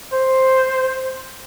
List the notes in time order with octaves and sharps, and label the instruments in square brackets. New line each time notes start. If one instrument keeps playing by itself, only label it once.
[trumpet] C5